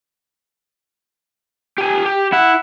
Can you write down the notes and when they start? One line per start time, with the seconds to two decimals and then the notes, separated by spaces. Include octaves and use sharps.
1.78 G4 G#5
2.06 G4
2.32 E4 F#5